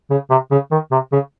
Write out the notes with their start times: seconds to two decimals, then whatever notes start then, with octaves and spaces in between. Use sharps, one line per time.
0.10 C#3
0.30 C3
0.51 C#3
0.72 D#3
0.92 C3
1.12 C#3